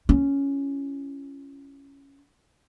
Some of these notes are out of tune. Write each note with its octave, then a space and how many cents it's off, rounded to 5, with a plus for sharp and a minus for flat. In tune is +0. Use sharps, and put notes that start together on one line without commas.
C#4 +0 E4 +45